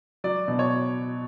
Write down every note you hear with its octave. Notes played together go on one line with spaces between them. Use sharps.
F#3 D5
B2
C#5